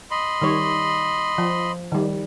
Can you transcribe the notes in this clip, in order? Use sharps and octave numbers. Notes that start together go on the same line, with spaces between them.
D#5 B5 C6
D#3 G3 C#5
F3
D#3 G3